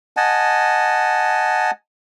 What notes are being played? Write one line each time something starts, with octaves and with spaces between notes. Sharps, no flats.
D#5 F#5 G#5 A5